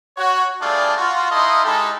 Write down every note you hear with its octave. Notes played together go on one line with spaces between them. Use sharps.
F#4 C#5
G3 A3 D4 F4 G#4 D5
F4 F#4
D#4 E4 A4 D#5 F5 C6
G#3 D#4 E4 G4 A4